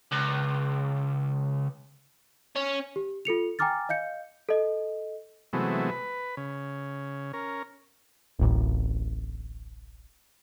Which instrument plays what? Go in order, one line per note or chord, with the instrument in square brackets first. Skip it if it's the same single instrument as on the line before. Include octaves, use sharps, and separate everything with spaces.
[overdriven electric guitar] C#2
C#4
[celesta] G4
F4 A4 C#7 F7
G5 G#5 A#5 D6 F6 A6
D#5 F5 G6 C#7
A4 D#5
[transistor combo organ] C3 E3 F#3 G#3 A3 B3
B4
C#3
C#4 A#4
[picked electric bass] D1 A1